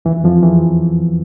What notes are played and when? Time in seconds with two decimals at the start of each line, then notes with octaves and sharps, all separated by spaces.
0.05 E2 E3
0.24 F2 F3
0.43 E2 E3